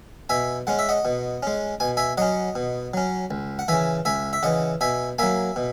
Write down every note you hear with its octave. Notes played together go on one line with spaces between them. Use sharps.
B2 E5 G#5
G#3 C#4 F#5
E5
D#5 F#5
B2
G#3 C#4
B2 G#5
E5 G#5
F#3 C#4 D#5 F#5
B2
F#3 C#4
C#2
F#5
C#3 E3 E5 G#5
C#2 E5 G#5
E5
C#3 E3 D#5 F#5
B2 E5 G#5
F#3 A#3 E5 G#5
B2